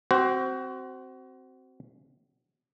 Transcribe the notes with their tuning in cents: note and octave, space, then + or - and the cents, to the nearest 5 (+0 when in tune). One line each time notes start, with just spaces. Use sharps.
C4 +0 F#4 +25 C5 +0